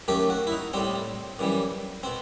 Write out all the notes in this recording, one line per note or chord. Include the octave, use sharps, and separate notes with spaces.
F#2 D#3 A3 G4
F#4
E4
D#4
A2 G3 C4
F#2 E3 G3
B2 C4